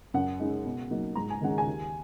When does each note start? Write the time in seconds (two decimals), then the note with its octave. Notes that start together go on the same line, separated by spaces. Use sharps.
0.14 F#2 F#5
0.39 C#3 G#3 D#4
0.65 B2
0.90 F#3 A#3 D#4
1.15 G#2 A#5
1.30 G#5
1.41 D#3 G#3 C#4 F#5
1.58 G#5
1.67 D#2